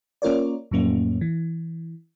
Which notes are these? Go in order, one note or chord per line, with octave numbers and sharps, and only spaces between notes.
A#3 C#4 F4 A#4 C#5 D5
F2 A2 F#3 A#3 C#4
E3